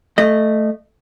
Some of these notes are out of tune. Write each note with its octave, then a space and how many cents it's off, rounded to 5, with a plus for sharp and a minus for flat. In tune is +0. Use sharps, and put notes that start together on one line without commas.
A3 +0 D#5 -20